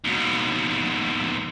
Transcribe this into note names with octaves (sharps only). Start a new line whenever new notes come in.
D#2 B2